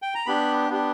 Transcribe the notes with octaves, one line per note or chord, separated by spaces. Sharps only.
G5
A#5
B3 D4 G4 B5
B3 D4 G4